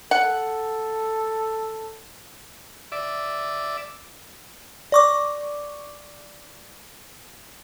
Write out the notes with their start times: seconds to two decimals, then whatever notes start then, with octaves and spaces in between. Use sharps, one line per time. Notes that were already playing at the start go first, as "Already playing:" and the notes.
0.11 A4 F#5
2.92 D5 E5
4.92 D5 C#6 D6